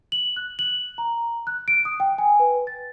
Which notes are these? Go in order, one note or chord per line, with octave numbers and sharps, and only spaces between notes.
F#7
F#6
F#7
A#5
F#6
D7
D#6
G5
G#5
B4
A6